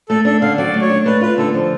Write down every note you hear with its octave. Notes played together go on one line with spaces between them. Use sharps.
A3 A4
D4 A4
D3 F5
F#3 D5
A3
C#5
D4
A3 B4
F4 B4
D3 A4
F3